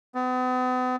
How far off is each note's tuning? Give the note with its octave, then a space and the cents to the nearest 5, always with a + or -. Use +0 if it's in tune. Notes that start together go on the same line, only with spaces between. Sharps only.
B3 +40